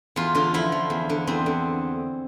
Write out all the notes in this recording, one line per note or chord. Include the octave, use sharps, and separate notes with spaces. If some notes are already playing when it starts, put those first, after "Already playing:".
E2 F4
D3 F4
F3 E4
F3
E2
D3
E2 C4
D3